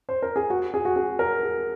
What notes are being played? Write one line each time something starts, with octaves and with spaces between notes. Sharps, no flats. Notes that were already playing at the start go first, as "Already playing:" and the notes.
C5
A#4
G#4
F#4
G#4
F#4
G#4
A#4
G#4